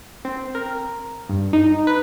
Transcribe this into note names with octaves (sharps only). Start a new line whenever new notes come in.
C4
A#4
G2
D#4
B4